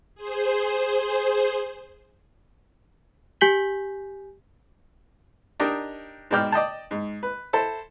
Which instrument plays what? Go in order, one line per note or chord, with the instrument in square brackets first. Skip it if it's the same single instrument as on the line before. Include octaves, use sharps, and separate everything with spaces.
[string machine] G#4 C5
[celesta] G4 G#5 G6 B6 F#7 G7
[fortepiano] D4 D#4 G4 A#4 D#5
G#2 B2 D5 G5 F6
D5 D#5 G5 A5
G#2
B4
E4 A4 C5